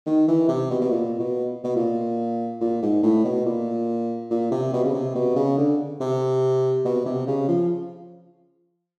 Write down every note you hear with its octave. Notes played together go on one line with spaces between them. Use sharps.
D#3
E3
C3
B2
B2
A#2
B2
B2
A#2
A#2
G#2
A2
B2
A#2
A#2
C3
B2
C#3
C3
B2
C#3
D3
C3
B2
C3
C#3
F3